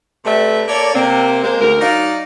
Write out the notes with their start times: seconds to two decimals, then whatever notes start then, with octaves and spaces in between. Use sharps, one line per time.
0.25 C3 A3 G4 B4 D5 E5
0.68 A#3 A4 C#5 D5
0.94 C3 A#3 C4
1.43 G#3 A#3 C5
1.61 D2 A#4
1.81 F#3 D#4 D5 F5